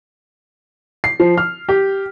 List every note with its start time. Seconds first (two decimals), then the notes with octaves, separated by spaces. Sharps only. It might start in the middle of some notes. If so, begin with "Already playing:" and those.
1.04 C7
1.20 F3
1.38 F6
1.69 G4